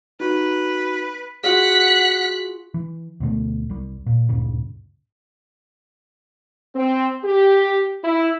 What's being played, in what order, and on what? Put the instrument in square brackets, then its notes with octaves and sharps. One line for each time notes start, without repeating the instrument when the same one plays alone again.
[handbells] D#4 F#4 [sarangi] B4
[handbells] F4 F#4 G#4 [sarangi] F#5 [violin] F#6 B6
[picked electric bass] E3
D2 B2 G3 A3
C2 G3
A#2
D2 G2 A#2 C#3
[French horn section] C4
G4
E4